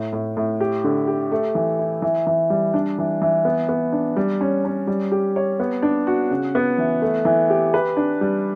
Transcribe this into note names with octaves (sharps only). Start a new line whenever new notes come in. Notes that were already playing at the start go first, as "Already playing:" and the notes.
Already playing: A2
A2
A2
G4
D3
G4
A3
E3
E4
E3
E3
G3
D4
E3
E3
B3
B3
D4
G3
C#4
C#4
G3
G4
C#5
B3
D4
F#4
C#3
B3
E3
A3
E3
G4
B4
D4
G3